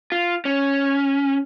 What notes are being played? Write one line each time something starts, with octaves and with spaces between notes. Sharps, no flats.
F4
C#4